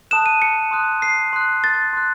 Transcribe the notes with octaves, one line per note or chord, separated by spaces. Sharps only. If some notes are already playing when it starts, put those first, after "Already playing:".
A5 D#6 F#6 E7
D#7
C#7
C6 D#6 F#6
C7
C6 D#6 F#6
A6
C6 F#6